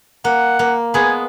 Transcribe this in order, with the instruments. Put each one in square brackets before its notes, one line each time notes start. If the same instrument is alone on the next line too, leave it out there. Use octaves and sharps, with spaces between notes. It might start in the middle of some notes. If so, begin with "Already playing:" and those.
[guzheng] A#3 [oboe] F#5
[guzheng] A#3
[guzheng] G#3 B3 [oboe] G#5